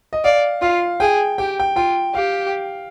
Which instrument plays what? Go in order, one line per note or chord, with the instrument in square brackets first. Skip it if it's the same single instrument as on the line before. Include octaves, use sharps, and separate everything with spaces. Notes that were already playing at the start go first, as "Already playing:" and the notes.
[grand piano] D#5
[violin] D5 [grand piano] F5
[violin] F4 [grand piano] F5
[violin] G#4 [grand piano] G5
[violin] G4 [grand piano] G5
[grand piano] G5
[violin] F4 [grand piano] G5
[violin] G4 [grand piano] F5